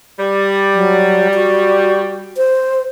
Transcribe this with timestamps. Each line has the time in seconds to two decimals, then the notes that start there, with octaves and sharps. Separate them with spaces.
0.19 G3
0.75 F#3
1.34 F#4
2.37 C5